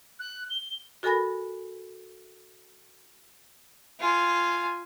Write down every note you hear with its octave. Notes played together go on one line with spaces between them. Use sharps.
F#6
G7
F#4 A4 A#4 G#5 B5 A#6
F4 G#5